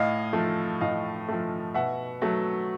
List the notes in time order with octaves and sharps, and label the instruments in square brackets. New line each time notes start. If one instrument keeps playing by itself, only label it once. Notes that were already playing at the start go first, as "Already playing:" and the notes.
Already playing: [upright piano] A2 D#5 F5
F3 A3
A2 D#5 F5
F3 A3
B2 E5 F#5
F#3 A3